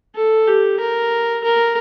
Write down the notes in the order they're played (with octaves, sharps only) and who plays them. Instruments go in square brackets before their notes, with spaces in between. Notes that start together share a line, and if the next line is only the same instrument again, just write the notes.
[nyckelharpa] A4
G4
A#4
A#4